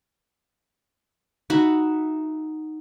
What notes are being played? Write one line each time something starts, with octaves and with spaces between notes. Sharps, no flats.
D#4 F#4 E5 B5